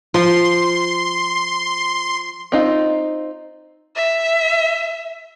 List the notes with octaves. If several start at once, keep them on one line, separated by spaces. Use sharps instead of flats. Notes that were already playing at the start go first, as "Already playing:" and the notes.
F3 C6
C4 D#4 F4
E5